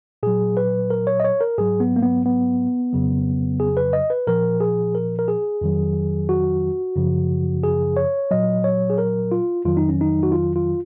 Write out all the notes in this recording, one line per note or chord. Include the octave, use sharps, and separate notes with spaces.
A#2 F#3 G#4
B4
A#4
C#5
D#5
C#5
A#4
G#2 F#3 G#4
B3
A#3
B3
B3
F2 C#3 F#3
G#4
B4
D#5
B4
A#2 F3 A#4
G#4
A#4
A#4
G#4
F2 D#3 F#3
F#4
F#2 C#3 F3
G#4
C#5
A#2 F#3 D#5
C#5
G#4
A#4
F4
F2 D#3 F#3 F4
D#4
C#4
D#4
F#4
F4
F4